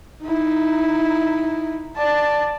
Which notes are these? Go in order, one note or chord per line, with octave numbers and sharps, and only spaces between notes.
D#4 E4
D5 A5